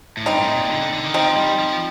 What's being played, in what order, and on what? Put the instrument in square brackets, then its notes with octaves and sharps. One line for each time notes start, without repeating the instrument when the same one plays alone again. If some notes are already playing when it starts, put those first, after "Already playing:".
[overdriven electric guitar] A2
[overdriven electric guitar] G2 [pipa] C4 D#4
[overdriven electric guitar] A2
A#2
D3
D3
D3
D#3
[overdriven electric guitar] F3 [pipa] C4 D#4
[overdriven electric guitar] G3
F3